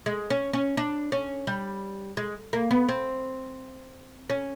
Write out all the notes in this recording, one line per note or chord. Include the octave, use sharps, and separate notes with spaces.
G#3
C#4
C#4
D4
C#4
G3
G#3
A#3
B3
C4
C#4